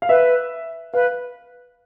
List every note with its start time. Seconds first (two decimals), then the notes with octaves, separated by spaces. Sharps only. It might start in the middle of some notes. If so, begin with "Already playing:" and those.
0.02 F5
0.09 B4 E5
0.94 B4 F5